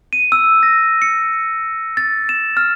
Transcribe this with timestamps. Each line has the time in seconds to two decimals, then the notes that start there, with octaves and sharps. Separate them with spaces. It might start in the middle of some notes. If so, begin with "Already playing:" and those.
0.13 D#7
0.32 E6
0.63 A#6
1.02 C#7
1.97 A6
2.29 E7
2.57 F6